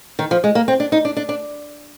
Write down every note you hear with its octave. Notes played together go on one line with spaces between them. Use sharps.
D#3
F3
G#3
A#3
C4
D4
D#4
D4
D4
D4